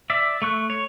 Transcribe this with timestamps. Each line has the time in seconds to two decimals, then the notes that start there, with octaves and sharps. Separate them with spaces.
0.10 D5 E5
0.42 A3 C#6 F#6
0.70 C#5